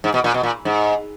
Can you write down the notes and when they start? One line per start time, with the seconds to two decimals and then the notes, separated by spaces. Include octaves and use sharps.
0.04 G#2
0.14 B2
0.24 A#2
0.34 B2
0.43 A#2
0.65 G#2